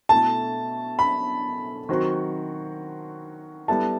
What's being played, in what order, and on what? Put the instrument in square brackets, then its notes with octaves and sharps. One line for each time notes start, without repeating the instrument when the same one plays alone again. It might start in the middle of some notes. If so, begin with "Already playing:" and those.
[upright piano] B2 A3 E4 A4 [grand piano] A5
[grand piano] B5
[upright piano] D#3 F#3 C4 F#4
[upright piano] G3 B3 E4 A4 [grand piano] A5